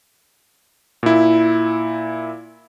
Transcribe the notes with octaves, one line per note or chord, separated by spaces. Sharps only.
A#2 E4